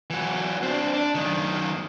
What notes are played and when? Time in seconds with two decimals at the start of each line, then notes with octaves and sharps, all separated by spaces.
0.10 E3 F#3
0.63 C4 D4
0.94 D4
1.15 F#2 D#3